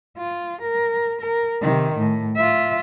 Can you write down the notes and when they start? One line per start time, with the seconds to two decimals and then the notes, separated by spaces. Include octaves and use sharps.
0.17 F4
0.62 A#4
1.21 A#4
1.62 C3 D#3
1.97 A2
2.36 F4 E5